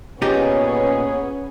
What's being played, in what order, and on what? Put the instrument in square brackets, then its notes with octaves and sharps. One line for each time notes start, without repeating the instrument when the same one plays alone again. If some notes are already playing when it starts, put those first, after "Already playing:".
[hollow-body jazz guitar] A#2 D#4 G4 [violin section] B3 C#4 C#5 [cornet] G#4